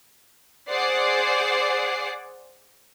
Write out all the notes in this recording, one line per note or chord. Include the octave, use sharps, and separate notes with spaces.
G#4 C5 D5 F#5 C7